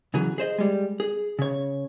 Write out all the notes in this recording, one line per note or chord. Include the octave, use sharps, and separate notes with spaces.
C#3 E3 F#3 G#4
G#4 C5 D#5
G3 G#3
G#4
C#3 C#5